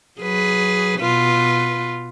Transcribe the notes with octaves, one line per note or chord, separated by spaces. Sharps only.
F#3 G#4 B4
B2 F4 B4